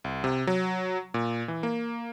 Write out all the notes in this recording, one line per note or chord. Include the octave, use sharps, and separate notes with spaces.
C2
C3
F#3
A#2
E3
A#3